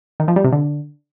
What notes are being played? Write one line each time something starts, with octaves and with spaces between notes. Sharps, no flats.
D#3
F3
G3
C3
D3